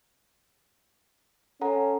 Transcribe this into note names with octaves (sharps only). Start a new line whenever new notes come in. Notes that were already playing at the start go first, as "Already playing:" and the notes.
C#4 A4 F#5 A#5